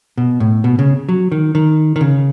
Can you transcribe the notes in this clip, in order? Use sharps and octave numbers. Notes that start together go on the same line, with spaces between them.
B2
A2
B2
C#3
F#3
D#3
D#3
D#3
C#3